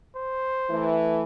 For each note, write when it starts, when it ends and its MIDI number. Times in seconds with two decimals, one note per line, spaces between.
0.15 0.89 72
0.70 1.24 52
0.70 1.24 57